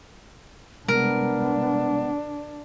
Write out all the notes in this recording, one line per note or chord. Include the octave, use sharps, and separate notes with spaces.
C3 G3 G#3 B3 D4 A#4